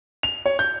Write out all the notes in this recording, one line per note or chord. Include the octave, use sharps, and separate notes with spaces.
F7
C#5
G6